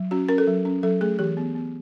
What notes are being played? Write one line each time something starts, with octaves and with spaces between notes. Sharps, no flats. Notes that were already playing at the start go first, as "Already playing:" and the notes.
Already playing: F#3
C#4 F#4
C#4 A#4
A4
F#3
C#4
F#3 A4
A3 G#4
E3 G4
B3
B3